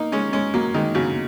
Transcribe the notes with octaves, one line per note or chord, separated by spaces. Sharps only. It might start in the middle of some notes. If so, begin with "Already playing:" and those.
Already playing: A#3 D#4
G#3 C#4
G#3 C#4
F#3 A#3
D#3 G#3
C#3 F#3